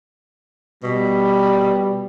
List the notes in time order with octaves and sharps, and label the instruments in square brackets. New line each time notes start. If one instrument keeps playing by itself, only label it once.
[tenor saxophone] B2 [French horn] G3